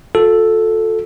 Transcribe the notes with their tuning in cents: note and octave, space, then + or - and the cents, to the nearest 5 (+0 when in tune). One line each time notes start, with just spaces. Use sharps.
F4 +45 A4 +0